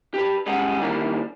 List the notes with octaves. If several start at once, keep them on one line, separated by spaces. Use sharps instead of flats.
G4 B4
G3 G#3 C#4 G#4 F#5
D#3 E3 G3 A#3 D4